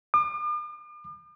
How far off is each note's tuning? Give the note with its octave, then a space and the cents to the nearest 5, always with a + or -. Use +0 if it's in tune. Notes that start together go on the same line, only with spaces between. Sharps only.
D6 +45